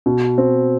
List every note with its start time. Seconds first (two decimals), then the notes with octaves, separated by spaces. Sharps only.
0.06 B2
0.38 C4